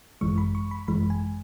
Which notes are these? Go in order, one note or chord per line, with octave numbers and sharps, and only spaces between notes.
G#1 F#2 E3 G#3 C#6
B5
C#6
B5
G#1 F#2 E3 G#3 B5
G#5